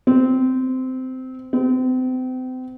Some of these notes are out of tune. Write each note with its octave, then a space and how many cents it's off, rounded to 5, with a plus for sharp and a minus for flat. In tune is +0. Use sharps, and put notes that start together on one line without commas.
C4 -15
C4 -35